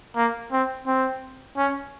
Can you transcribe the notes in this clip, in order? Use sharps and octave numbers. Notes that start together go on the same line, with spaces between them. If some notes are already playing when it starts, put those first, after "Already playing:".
A#3
C4
C4
C#4